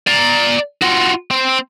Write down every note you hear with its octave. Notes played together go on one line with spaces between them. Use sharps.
D5 A#5
F4 F#4
C4